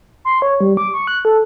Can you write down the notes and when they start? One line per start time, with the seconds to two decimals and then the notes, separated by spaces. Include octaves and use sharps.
0.25 C6
0.42 C#5
0.61 G3
0.77 D6
0.94 C#6
1.07 F#6
1.25 A4